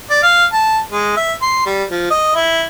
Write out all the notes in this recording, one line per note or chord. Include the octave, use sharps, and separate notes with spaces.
D5
F5
A5
G#3
E5
C6
G3
F3
D#5
E4